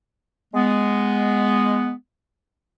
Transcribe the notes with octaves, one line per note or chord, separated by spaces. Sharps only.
G#3 B3